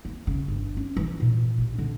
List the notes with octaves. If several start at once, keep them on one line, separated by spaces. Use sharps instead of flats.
A#3
C#3
G1
C#4
E3
A#2
A1
D3